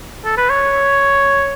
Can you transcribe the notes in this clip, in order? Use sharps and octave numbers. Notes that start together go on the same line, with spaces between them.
A4
B4
C#5